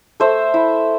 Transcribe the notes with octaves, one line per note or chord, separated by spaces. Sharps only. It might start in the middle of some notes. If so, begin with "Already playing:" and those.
A3 C5 E5
E4